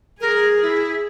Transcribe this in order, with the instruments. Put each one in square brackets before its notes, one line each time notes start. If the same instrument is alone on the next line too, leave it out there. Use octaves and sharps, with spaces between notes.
[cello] G#4 [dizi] A#4
[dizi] E4